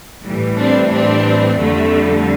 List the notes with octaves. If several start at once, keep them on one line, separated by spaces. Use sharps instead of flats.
A2 E3 G3
C4 D4
C4 D4
F2 D3 G3 A3